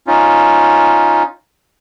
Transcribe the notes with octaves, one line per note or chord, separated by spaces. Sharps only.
C#4 D#4 F4